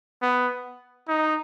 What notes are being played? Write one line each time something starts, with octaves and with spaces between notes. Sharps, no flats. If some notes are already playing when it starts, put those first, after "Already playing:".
B3
D#4